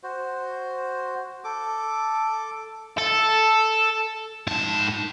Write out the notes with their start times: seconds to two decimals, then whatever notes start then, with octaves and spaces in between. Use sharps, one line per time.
0.03 F#4 C5
1.44 A4 D6
2.98 A4
4.47 G#2 A5